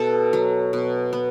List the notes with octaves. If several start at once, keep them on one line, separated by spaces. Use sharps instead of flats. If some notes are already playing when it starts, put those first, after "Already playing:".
Already playing: B2 A4
F#3
B2
B3